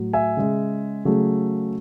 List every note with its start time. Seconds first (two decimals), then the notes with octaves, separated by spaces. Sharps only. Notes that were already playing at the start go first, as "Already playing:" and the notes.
Already playing: A2 F#3 A3
0.13 E5 G#5
0.37 C#3 G#3
1.05 C#3 F#3 A3